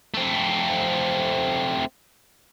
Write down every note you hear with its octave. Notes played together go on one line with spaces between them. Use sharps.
A3 C4